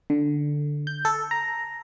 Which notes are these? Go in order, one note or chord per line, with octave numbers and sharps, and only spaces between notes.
D3
G6
A4
A#5